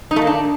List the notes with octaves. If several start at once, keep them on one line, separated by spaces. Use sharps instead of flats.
D#4
A3
A#3
D4